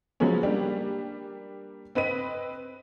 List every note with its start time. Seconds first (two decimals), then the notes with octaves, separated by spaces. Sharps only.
0.20 F3 F#3 G#3 B3 C#4
0.43 G3 A#3 D4 G4
1.95 C4 B4 D#5 B6 D#7